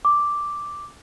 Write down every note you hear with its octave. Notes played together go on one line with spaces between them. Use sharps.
D6